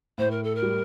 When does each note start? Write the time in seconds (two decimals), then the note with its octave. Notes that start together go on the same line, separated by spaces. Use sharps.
0.18 A2 C5
0.30 A#4
0.43 A4
0.55 A#4
0.62 G3